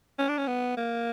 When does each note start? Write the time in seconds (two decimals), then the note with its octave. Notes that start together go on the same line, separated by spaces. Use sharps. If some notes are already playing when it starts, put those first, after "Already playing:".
0.19 C#4
0.29 D4
0.38 C#4
0.47 B3
0.77 A#3